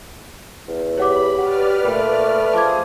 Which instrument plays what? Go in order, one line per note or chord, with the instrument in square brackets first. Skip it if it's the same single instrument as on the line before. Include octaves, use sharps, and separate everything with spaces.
[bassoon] E2
[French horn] G4 [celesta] C#5 F#5 D6 [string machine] B5
[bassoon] F#4 [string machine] B4 D5 F6
[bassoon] A#2 [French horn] A3 [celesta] G5 B5
[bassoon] F3 [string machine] G#4 A4 D#6 [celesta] A5 D6 G#6